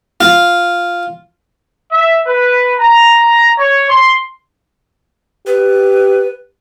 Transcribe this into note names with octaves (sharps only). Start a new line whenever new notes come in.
F4
E5
B4
A#5
C#5
C6
G4 B4